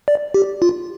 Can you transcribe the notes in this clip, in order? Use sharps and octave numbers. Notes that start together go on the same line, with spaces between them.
D5
G4
F4